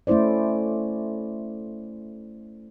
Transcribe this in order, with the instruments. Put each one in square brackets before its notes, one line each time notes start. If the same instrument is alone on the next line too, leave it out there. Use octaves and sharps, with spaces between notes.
[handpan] A3 C#4 E4 C5 D5